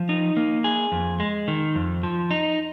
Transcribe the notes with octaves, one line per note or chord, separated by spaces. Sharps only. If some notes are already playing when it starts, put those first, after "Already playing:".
Already playing: F3
D#4
A#3
G#4
F2
G#3
D#3
F2
F3
D#4